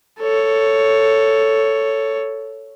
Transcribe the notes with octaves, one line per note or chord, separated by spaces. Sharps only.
A4 C#5